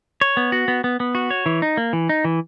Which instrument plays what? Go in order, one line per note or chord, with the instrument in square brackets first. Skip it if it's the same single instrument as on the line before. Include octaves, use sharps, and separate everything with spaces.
[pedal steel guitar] C#5
B3
F#4
B3
B3
B3
F#4
C#5
E3
D#4
A#3
E3
D#4
E3